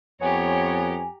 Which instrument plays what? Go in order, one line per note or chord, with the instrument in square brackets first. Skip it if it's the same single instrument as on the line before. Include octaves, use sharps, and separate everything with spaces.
[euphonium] F2 [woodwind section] B3 C#5 [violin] G4 A#5 [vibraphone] G#5